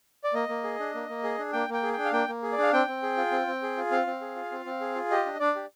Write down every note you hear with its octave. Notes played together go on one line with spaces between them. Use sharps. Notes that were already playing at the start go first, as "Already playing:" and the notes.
D5
A#3 D#5
A#3
G#4
D4
A#3
A#3
G#4
D4
A#3 G5
A#3 G5
G#4
D4 G5
F5
A#3 G5
A#3
G#4
D5
D4 F5
C4 G5
C4
G#4
F4
C4
C4
G#4
F4
C4 F5
C4
G#4
F4
C4
C4
G#4
F4
G4 D#5
D4
D4 D5
G4